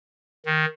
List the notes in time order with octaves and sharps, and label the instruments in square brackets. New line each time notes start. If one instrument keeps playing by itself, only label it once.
[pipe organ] D#3